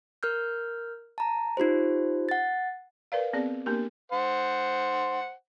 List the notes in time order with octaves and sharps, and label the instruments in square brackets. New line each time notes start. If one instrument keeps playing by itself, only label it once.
[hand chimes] A#4 F6 G6
A5 A#5
D#4 F4 G4 C5
F#5 A6
[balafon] A#4 B4 D5 F5
B3 C4 G#4 D5
A#3 B3 D4 G4 A#4
[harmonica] C5 F#5